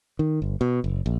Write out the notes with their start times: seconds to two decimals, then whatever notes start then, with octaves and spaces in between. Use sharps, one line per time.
0.19 D#3
0.42 G1
0.61 B2
0.84 F#1
1.06 A#1